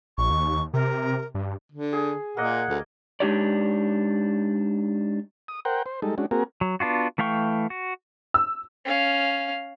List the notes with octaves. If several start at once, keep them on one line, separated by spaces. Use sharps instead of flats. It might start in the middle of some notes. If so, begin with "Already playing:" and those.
A#1 C#6
D#2
C3 A#4
G2
D3
G#4
A#2 A#3 D#5 F#5
D2
G#3 D4 D#4 G4 C#5 D5
D#6
A#4 C5 F#5 G5
C5
G3 G#3 D#4 A4
G#3 C#4 D4 F#4
A#3 C4 F#4 G#4 A#4
F#3
B3 D4 F4 F#4
E3 A3 F5 G5 C#6
F#4
E6
C#4 F5